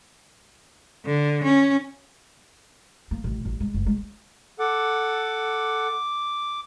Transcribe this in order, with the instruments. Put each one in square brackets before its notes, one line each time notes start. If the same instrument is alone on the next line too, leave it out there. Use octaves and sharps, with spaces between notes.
[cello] D3
C#4
[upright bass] A#3
A1
A1
G#3
F#1
G#3
[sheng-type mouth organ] A4 F#5 [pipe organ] D6